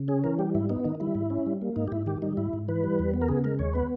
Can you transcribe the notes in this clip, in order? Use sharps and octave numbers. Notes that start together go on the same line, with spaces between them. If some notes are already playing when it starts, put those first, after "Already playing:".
Already playing: C#3
C#4 G#4
E3 A#4
G3 G4
G#2 E4
B3 D#4
D#3 D#4
G3 E4
G#2
C#4
G3
A#3
G#2 D#4
G4
G#2 E4
D#3 G4
G3 D#4
G#2 E4
G#2
E3 B4
G3
E2
B3
A#4
C#3 G#4
G#3 A#4
D#2 C#5
B3 B4